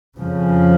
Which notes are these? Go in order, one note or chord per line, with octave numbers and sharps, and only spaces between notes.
F2 C#3 F3